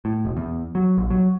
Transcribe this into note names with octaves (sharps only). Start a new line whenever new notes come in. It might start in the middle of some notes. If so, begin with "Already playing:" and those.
A2
E1
E2
F#3
A#1
F#3